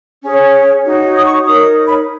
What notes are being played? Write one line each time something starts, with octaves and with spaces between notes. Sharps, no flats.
C#4 G#4 C#5
D#4 F#4 C#5
D#6
C#6
D#4 A#4 C#5 D#6
B5